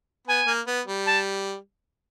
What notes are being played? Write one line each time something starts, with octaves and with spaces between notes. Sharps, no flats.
B3 G#5
A#3
B3
G3
A5